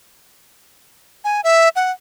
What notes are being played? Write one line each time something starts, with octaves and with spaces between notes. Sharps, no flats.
G#5
E5
F#5